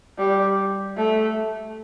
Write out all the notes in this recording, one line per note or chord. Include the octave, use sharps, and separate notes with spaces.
G3
A3